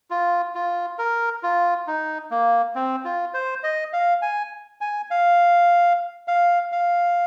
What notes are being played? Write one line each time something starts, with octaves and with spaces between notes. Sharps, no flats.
F4
F4
A#4
F4
D#4
A#3
C4
F4
C5
D#5
F5
G#5
G#5
F5
F5
F5